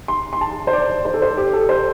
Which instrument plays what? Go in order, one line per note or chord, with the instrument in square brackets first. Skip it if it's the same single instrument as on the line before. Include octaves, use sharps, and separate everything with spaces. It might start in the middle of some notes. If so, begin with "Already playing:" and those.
[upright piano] C6
C6
A5
C5
D5
C5
A4
C5
G4
A4
C5